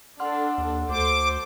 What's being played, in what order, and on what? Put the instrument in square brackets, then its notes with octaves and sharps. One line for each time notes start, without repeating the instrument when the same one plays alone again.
[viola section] D4 A4 [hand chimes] F#5 C6 F6
[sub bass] D#2
[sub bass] D2 [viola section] A4 C5 [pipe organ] D6